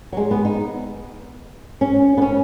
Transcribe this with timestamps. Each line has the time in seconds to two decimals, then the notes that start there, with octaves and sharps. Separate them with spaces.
0.13 F#3
0.17 G#3
0.31 B3
0.45 D#4
1.81 C#4
2.17 B3
2.22 C#4